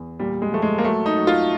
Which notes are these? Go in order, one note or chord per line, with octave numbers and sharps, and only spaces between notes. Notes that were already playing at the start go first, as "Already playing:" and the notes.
Already playing: E2
A#2 G3
G#3
F3 A3
G#3
A#3
F#3 A3
D#4
F#3
F4